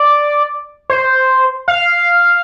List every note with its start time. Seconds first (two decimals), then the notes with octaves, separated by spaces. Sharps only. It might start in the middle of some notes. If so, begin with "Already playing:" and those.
Already playing: D5
0.90 C5
1.68 F5